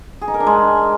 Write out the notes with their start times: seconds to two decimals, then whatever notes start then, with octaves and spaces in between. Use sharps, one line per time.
0.21 G#4
0.28 D#4
0.34 A#4
0.40 D4
0.47 G#3